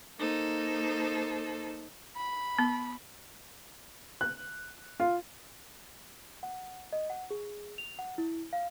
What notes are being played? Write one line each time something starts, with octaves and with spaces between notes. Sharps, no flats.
A#3 D#4 A4 C5
B5
B3
F#6
F4
F#5
D#5
F#5
G#4
F7
F#5
E4
F5